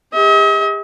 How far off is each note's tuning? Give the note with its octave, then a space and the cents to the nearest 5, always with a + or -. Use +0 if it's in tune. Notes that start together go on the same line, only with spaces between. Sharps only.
G4 +45 D#5 +45